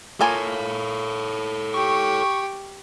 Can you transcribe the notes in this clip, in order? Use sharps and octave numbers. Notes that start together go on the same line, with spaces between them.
A#3 F4 A4 C#5 G#5
G4 C#6